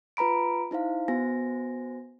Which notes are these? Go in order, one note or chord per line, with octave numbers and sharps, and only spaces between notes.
F4 B4 A#5 B5 D7
D#4 E4 C5 F5
B3 F#4 C5 G#5 A#6